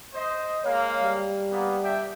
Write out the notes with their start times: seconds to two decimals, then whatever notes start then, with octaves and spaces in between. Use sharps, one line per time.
0.14 C5 D#5
0.64 G#3 A#3 C#5 F5
1.03 G3
1.50 A#3 B3
1.83 D4 E5 G5